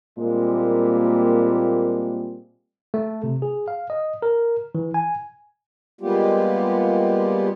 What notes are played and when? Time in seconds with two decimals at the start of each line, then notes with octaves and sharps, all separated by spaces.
0.18 A#2 G3 G#3 A#3 C4
2.94 A3
3.24 C3
3.42 G#4
3.68 F5
3.90 D#5
4.22 A#4
4.75 E3
4.94 G#5
6.01 G3 G#3 A#3 B3 F4 G4